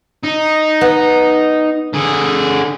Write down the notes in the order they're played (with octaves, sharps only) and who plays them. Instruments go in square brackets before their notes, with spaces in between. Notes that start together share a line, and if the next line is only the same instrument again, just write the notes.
[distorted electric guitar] D#4
[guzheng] B3
[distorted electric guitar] D3 G#4